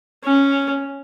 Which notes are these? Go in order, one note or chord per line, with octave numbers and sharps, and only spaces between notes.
C#4